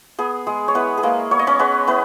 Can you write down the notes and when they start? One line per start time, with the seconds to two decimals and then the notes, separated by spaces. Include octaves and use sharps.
0.19 B3 G#4
0.47 G#3 G#4
0.68 C#5
0.75 B3 E4 B4
0.98 G#4
1.03 G#3 A#3 A#4
1.31 B3 C#5
1.39 D#5
1.47 C#4 C#5
1.59 G#3 B3 B4
1.87 B3 E4 B4